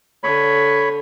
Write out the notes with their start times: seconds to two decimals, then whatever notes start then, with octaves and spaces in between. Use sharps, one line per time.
0.24 D3 C#5 B5